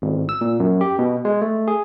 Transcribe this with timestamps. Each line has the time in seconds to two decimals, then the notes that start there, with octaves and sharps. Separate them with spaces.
0.02 G#1
0.29 E6
0.41 A#2
0.60 F#2
0.81 G4
0.99 B2
1.25 G#3
1.42 A3
1.68 G#4